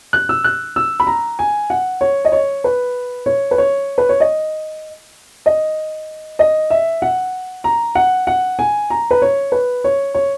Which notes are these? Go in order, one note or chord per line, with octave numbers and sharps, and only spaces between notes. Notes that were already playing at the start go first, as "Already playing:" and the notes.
F#6
E6
F#6
E6
B5
A#5
G#5
F#5
C#5
D#5
C#5
B4
C#5
B4
C#5
B4
C#5
D#5
D#5
D#5
E5
F#5
A#5
F#5
F#5
G#5
A#5
B4
C#5
B4
C#5
C#5